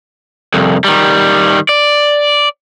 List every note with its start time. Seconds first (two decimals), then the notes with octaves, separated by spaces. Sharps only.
0.54 C2 F2
0.84 D#3 G3
1.69 D5